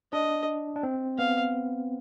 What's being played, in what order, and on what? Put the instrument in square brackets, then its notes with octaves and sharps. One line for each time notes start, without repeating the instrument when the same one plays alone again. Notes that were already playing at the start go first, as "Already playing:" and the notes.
[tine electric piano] D4 [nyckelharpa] D#5
[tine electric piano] D4
C4
[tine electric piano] B3 [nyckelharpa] F5